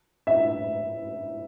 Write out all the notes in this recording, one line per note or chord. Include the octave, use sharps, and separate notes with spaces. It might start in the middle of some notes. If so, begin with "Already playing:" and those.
E5